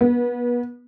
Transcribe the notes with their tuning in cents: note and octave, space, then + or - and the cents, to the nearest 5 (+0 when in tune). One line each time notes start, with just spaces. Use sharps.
B3 -30